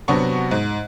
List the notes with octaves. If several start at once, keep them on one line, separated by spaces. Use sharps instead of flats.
C3 F#3 B3 D4 F#4 C#6
G#2